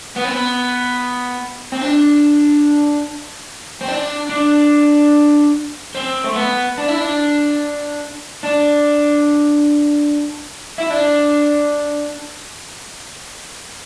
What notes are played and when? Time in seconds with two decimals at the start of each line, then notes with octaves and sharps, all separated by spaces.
0.16 B3
0.24 C4
0.32 B3
1.72 C4
1.81 D4
3.81 C4
3.88 D4
4.29 D4
5.95 C4
6.24 A3
6.36 B3
6.78 D4
6.88 E4
6.98 D4
8.43 D4
10.78 E4
10.91 D4